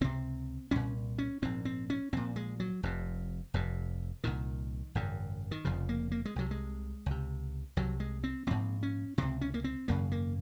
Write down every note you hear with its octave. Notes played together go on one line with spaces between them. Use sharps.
C#2 C3 C4
C2 A#2 C#4
C#4
A#1 G#2 C4
C4
C#4
A#1 A#2 C4
G#3
F#3
F1 F2 C3
F1 F2 C3
C2 A#2 D#3
G#1 F#2 C#3
D#3
F1 F2 C#3 F3
A#3
A#3
G#3
C2 C3 F#3
G#3
C#2 C3
C2 C3 F#3
G#3
C4
A#1 G#2 C4
C#4
C#2 C3 C4
C#4
A#3
C4
G#1 F#2 C#3 A#3
A#3